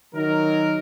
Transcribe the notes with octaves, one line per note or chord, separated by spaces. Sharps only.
D#3 F#3 D#4 A#4